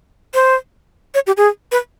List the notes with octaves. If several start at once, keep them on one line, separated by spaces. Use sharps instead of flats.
C5
C#5
G4
G#4
B4